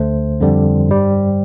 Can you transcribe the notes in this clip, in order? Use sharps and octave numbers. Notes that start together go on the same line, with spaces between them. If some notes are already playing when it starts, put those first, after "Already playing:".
Already playing: D2 D3 A3 C5
F2 D3 G3
G2 G3